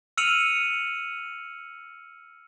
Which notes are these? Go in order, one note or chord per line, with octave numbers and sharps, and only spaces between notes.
E6 F6 C#7 D#7 F7 F#7